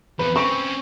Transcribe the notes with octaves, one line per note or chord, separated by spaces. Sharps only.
E2 F3 B4
C4 C#4 C#6